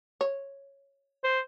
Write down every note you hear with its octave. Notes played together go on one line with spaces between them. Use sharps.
C#5
C5